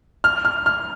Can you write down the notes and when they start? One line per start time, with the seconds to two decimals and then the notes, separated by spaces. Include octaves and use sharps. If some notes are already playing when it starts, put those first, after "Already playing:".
0.24 F6
0.45 F6
0.66 F6